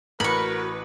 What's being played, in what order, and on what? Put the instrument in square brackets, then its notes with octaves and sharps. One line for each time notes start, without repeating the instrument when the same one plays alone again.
[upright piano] A1 [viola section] F#4 B4 [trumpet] A#4 [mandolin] B5 C#6